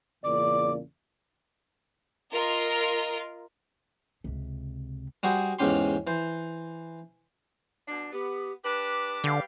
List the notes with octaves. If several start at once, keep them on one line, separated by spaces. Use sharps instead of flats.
E2 A#2 C#3 D5 D6
F4 A#4 D#5
C#2 C3
G3 F#4 G#4 C5
E2 G#2 C#3 C#4 G4 C6
E3 C5
B2 D4
B3 G4
D4 G4 B4 D6
D3 G3 B4 F5